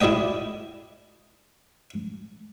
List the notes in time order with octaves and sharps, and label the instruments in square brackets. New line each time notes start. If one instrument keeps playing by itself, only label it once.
[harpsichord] E4 G#4 D5 D#5 G5